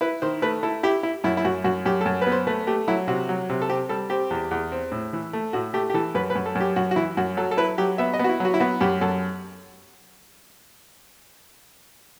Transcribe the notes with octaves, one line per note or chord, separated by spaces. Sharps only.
E4 B4
D#3 C5
A3 B4
E4 A4
E4 G4
E4
F#2 E4
E4
F#2 F#4
F#2 F#4
F#2 G4
A4
F#2
B4
B3
C5
A3 B4
A3 G4
F#3 E4
C3 F#4
F#3
C3
A4
C4 G4
G3 A4
C4 G4
E2
E2
C4
A2
E3
A3
A2 F#4
A3 G4
G4
E3 A4
F#2 B4
B4
F#2
A4
F#2
G4
F#2 F#4
F#4
E3 E4
F#2 F#4
F#3 A4
A4
E4 B4
F#3 G4
B3 E5
D#5
B3 F#4
E4
F#3 F#4
E4
B3 F#4
F#2 G4
F#2 A4